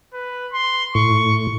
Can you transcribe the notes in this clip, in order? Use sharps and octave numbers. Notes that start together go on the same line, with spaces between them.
B4
C6
A2 C#6